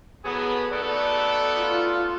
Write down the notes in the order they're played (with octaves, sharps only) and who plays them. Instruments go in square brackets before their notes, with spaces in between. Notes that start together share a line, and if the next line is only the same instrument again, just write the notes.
[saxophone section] A2 F#3 G#4 [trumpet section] B3
[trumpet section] A3 B3 A4 [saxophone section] D#4 F#4 D5
[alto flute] F4